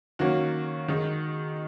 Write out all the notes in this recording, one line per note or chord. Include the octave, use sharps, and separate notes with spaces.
D#3 F#3 A#3 C#4 F#4
D#3 G#3 D#4